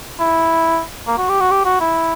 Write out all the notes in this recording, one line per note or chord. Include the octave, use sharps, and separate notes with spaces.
E4
A#3
F#4
G4
F#4
G4
F#4
E4